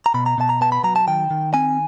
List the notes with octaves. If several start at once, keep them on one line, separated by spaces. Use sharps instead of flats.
A#5
B2 B5
A#5
B2 A5
A#5
B3 A5
B5
F#3 A#5
A5
D#3 G5
D#3
C4 G#5